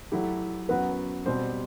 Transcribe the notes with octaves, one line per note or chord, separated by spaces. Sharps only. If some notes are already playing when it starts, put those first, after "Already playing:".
F#3 A3 E4 G4
F#2 F#3 B3 F#4 B4
B2 G3 C4 G4 C5